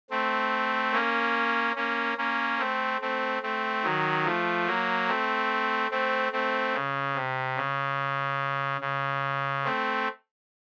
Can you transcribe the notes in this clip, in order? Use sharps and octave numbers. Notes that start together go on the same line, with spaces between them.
A3 C4
A#3 C#4
A#3 C#4
A#3 C#4
A3 C4
A3 C4
A3 C4
D#3 F#3
F3 A3
F#3 A#3
A3 C4
A3 C4
A3 C4
C#3
C3
C#3
C#3
A3 C4